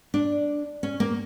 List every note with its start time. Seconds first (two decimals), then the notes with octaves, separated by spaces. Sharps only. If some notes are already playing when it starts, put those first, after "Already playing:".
0.14 D4
0.83 C#4
1.00 A#3